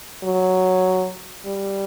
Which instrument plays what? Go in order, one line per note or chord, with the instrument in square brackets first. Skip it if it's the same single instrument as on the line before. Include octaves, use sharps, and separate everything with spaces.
[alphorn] F#3
G3